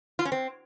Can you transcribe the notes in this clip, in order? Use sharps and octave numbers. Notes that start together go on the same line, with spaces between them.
F4
C#4
C4